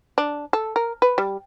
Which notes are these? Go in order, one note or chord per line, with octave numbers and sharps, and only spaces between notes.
D4
A4
A#4
B4
G3